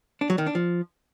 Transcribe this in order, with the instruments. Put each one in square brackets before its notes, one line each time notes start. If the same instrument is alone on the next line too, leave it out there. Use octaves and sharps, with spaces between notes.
[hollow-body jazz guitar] D4
F#3
D#3
D4
F3